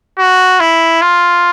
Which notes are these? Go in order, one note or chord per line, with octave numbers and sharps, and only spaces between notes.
F#4
E4
F4